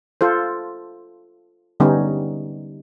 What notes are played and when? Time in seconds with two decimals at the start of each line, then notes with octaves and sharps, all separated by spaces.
0.21 F4 A4 C5
1.80 D3 G3 B3 C#4 D#4